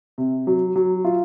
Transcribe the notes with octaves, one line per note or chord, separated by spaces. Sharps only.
C3
F#3
F#3
F4